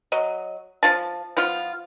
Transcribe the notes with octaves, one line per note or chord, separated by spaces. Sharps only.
F#3 D#5
F3 F4 A5
F3 B3 F4